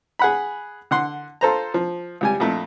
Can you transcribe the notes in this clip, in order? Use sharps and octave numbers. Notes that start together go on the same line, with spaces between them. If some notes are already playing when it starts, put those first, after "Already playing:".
G#4 F#5 B5
D3 F#5 C6
F4 A4 C5 A#5
F3
C#2 G3 G#5
F2 A#2 A3